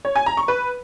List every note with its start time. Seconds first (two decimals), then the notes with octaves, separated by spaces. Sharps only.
0.05 C#5
0.15 G#5
0.26 A#5
0.37 C#6
0.48 B4